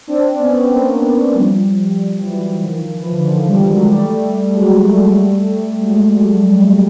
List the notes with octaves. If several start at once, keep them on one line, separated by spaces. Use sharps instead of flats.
C4 D4
B3 C#4
A#3 C4
F3 G3
E3 F#3
G3
E3 F#3
D#3 F3
E3
F3
D3 E3
D#3 F3
F3 G3
F#3 G#3
G3 A3
F#3 G#3
G3 A3
F#3 G#3
F#3 G#3